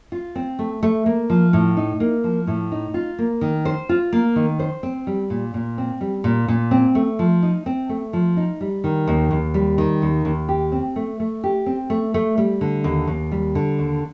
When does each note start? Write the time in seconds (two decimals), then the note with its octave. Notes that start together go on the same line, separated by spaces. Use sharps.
0.12 F4
0.35 C4
0.59 A3
0.83 A3
1.06 A#3
1.30 F3
1.53 A2
1.77 D#4
2.00 A#3
2.24 F3
2.47 A2
2.72 D#4
2.94 F4
3.19 A#3
3.41 D#3
3.65 C5
3.89 F4
4.13 A#3
4.36 D#3
4.59 C5
4.83 C4
5.07 G3
5.30 A#2
5.54 A#2
5.78 C4
6.01 G3
6.24 A#2
6.48 A#2
6.71 C4
6.95 A3
7.19 F3
7.42 D#4
7.66 C4
7.89 A3
8.13 F3
8.37 D#4
8.61 G3
8.84 D#3
9.07 D#2
9.31 D#2
9.54 G3
9.78 D#3
10.02 D#2
10.25 D#2
10.49 G4
10.72 C4
10.96 A3
11.20 A3
11.44 G4
11.66 C4
11.90 A3
12.14 A3
12.38 G3
12.61 D3
12.84 D#2
13.07 D#2
13.32 G3
13.55 D3
13.79 D#2